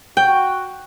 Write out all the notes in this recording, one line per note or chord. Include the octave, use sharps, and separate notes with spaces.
F#4 G5